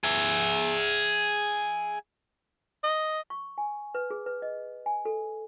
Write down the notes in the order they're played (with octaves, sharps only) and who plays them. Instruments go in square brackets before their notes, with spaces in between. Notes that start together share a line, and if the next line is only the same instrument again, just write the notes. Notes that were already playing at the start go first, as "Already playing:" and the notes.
[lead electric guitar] G#4 E5
[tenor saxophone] D#5
[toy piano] C#6
G#5
B4
G#4
B4
D#5
G#5
A4